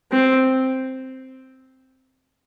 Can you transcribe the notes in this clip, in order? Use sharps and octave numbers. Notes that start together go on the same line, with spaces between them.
C4